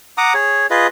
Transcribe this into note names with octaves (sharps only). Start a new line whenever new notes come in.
F#5 A#5 D6 D#6
G#4 C#5
F4 G#4 B4 D#5